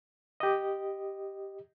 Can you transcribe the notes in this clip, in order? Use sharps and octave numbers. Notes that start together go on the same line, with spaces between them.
G4 D#5